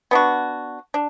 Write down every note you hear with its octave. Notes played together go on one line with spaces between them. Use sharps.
B3 D4 F#4
D4